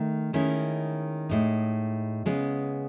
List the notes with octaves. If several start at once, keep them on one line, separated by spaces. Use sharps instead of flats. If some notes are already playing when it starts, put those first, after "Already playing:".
Already playing: D#3 A3 D#4
D#3 G#3 C#4 E4
A2 G#3 D#4
C#3 G#3 B3